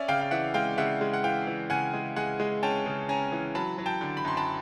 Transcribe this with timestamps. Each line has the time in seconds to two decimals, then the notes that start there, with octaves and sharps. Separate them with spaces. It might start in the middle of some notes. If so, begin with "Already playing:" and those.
Already playing: C#4 D5 E5
0.08 C#3 F5 G5
0.21 F5
0.31 E3 E5 F#5
0.54 G#3 F5 G5
0.78 C#3 E5 F#5
1.01 G#3
1.13 F#5
1.24 E3 F5 G5
1.47 E3
1.70 C#3 F#5 G#5
1.94 G#3
2.16 G#3 F#5 G#5
2.40 G#3
2.63 C#4 G5 A5
2.86 C#3
3.09 C#4 G#5 A#5
3.32 E3
3.55 F#3 A5 B5
3.78 F#3
3.86 G5 A5
4.01 D3
4.17 B5
4.25 F#2 C6
4.37 A5 B5